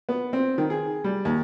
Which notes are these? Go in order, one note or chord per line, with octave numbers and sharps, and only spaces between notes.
B3
C4
D#3
G#4
G3
D#2